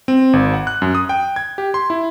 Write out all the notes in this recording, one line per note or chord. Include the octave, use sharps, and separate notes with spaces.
C4
G#1
F#5
F#6
F#2
D#6
G5
G#6
G4
C6
E4